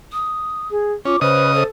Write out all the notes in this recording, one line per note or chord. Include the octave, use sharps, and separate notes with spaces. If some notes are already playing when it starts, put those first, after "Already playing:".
D#6
G#4
C#4 F4 D6
C#3 B4 C5 D#5 D#6
A4 C5